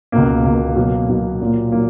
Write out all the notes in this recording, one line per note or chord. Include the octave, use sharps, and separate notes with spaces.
C#2 B2 A#3
C#2 B2 A#3
B2 F#3 A#3
B2 F#3 A#3
A#2 F#3 A#3
F#3 A#3